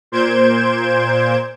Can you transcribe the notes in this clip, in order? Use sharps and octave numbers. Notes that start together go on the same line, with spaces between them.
A#2 C5 G6 G#6 D7 E7